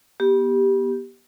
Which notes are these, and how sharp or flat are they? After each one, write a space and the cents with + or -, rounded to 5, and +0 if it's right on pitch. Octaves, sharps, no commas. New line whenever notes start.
B3 -30 G4 +0